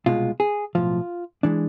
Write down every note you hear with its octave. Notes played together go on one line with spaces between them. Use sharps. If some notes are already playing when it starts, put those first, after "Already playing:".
C2 B2 G#3 F4
G#4
B1 A2 F3 F4
E3 G#3 D4